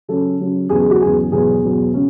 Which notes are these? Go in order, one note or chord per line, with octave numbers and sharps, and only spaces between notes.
C#3 F#3 C#4 A4
C#3 F#3 C#4
E2 C#3 F#3 G#4
G#4
F#4
E2 C#3 F#3 G#4
E2 B2 F#3 B3 G#4
E2 B2 F#3 B3
C#3 G#3 C#4